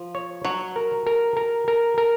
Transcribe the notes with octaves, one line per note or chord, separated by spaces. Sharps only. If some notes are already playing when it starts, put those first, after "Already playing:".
Already playing: F3
C#5
F#3 C#5
A#4
A#4
A#4
A#4
A#4